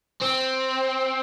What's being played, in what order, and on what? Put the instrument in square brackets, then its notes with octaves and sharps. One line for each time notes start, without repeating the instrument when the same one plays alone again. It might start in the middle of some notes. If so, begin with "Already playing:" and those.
[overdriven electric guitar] C4